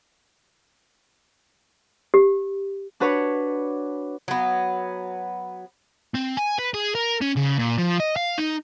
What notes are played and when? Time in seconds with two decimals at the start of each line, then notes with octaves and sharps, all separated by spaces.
2.14 G4
3.00 D4 F#4 B4 C#5
4.28 F#3 B3
6.14 C4
6.37 G#5
6.59 B4
6.74 G#4
6.95 A#4
7.21 C#4
7.36 C#3
7.58 A#2
7.78 F3
8.00 D#5
8.16 F5
8.38 D#4